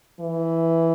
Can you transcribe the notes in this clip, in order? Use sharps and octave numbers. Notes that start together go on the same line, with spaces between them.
E3